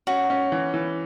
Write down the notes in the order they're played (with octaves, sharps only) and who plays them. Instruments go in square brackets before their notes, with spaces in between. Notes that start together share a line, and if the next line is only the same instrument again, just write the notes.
[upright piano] C#4 [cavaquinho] F#4
[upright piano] C#4
E3
E3